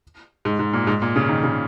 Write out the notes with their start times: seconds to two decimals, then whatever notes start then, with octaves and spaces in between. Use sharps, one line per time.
0.45 G#2
0.59 G#2
0.73 A#2
0.87 G#2
1.02 A#2
1.16 C#3
1.29 D#3
1.44 C#3